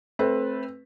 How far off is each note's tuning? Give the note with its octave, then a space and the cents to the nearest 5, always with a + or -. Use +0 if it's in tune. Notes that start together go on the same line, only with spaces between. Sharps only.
A3 -10 C4 +15 B4 -5